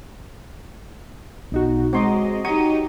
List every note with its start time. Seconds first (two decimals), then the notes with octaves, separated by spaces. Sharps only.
1.52 B1 D#4 F#4
1.93 F#3 G#3 C4 D#5 C6 D6
2.45 F#3 D#4 G4 D#5 C#6 D#7